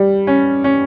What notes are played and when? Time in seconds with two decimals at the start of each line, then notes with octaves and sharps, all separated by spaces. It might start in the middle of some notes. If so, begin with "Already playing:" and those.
Already playing: G3
0.27 C#4
0.64 C#4